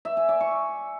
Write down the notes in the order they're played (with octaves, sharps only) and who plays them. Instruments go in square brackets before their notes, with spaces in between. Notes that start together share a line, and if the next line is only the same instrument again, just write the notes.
[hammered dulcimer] E5
G#5
D5
C#6